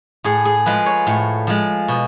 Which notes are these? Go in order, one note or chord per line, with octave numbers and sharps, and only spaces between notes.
A2 G#4
G#4
F3 G#3 B4
C#5
A2
F3 G#3
B2